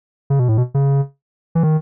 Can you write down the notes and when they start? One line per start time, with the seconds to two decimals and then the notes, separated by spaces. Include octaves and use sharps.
0.30 C#3
0.39 B2
0.48 A2
0.57 B2
0.74 C#3
1.55 E3
1.63 D#3